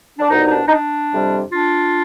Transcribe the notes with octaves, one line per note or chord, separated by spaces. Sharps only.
D4
C2 B2 G3 D#4
D#4
D4
D#4
D4
F2 C3 G3
D4 F4